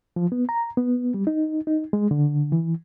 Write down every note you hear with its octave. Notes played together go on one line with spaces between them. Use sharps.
F3
B3
A#5
B3
G3
D#4
D#4
G#3
D3
E3